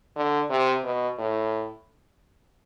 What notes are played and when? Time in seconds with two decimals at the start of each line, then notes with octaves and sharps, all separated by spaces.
0.16 D3
0.50 C3
0.84 B2
1.18 A2